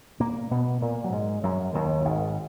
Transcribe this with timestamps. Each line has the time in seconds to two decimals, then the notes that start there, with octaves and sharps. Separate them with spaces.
0.20 A#2 A#3
0.51 B2 B3
0.82 A#2 A#3
1.04 F#3
1.12 G#2 G#3
1.43 F#2 F#3
1.74 D#2 D#3
2.01 F#2
2.05 G#1 G#2